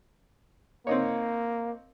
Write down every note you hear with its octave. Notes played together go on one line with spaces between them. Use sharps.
A#3 C4 D#4 C#5